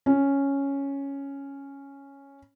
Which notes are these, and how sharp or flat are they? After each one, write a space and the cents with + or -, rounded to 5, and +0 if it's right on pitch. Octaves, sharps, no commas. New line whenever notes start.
C#4 +0